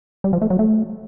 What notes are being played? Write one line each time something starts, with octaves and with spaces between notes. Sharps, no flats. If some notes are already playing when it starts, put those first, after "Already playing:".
G3
F3
A3
F#3
A3